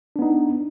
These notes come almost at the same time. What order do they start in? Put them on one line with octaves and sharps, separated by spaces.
D4 B3 D#4